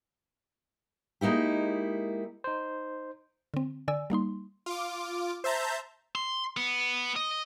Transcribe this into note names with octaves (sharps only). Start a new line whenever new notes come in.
G#3 A#3 D#4 E4 G4
D#4 C5
D3 C4
D3 D5 G#5 E6
G3 A#3 D#4 C6
F4 D6
C5 E5 A5 A#5 G6
C6
B3
D#5